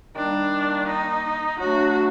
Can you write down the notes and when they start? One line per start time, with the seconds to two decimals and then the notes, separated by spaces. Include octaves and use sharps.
0.15 D#3 G3 A#3 D4
0.88 D#4
1.59 F#3 A3 D4 F#4